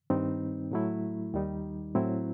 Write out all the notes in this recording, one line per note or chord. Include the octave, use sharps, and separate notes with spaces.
G2 D#3 G3 C4 D#4
A2 F#3 A3 E4
D#2 D#3 G3 D#4
A2 F#3 C4 E4